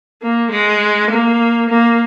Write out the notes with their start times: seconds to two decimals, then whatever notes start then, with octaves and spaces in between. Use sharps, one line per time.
0.22 A#3
0.51 G#3
1.11 A#3
1.70 A#3